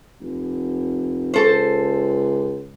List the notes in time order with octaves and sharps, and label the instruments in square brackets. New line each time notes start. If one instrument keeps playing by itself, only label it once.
[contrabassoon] F1
[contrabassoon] C#2 [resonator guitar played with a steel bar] A4 C5